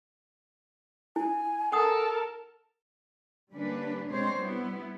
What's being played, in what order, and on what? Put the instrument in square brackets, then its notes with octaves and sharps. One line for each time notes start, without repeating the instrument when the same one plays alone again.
[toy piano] E4 [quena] G#5
[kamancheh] A4 A#4 [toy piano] F#5 D#6
[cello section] D3 G3 A#3 C#4 D4 B4
B2 G#3 C4 D4 C5 C#5
G3 B3 E4